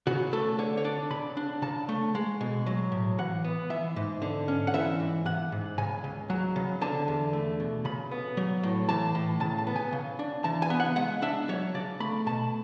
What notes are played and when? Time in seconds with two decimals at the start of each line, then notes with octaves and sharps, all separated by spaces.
0.07 C#3 F#4
0.33 A3 A4
0.59 D3 C#5
0.77 C#5
0.84 D4 D5
1.10 C#3 B5
1.37 D4
1.62 C#3 A5
1.89 A3
2.15 G#3
2.41 B2
2.66 F#3
2.92 A2
3.19 E3 F#5
3.44 B3
3.70 E3 E5
3.96 G#2
4.22 D3
4.48 C#4
4.67 F#5
4.74 E3 E5
5.00 G#2
5.25 E3 F#5
5.52 G#2
5.78 C#3 G#5
6.04 C#2
6.30 F#3
6.56 C#3
6.81 D3 A5
7.08 E2
7.33 A3
7.60 B2
7.85 C#3 B5
8.11 B3
8.37 F#3
8.63 A2
8.89 E3 A5
9.15 A2
9.40 C#3 A5
9.58 A5
9.67 B3
9.76 G#5
9.93 C#3
10.19 D4
10.44 E3 A5
10.62 G#5
10.70 B3
10.80 F#5
10.96 G#3 F#5
11.22 D4 E5
11.49 F#3 C#5
11.74 C#3 D5
12.00 A3 B5
12.26 B2 A5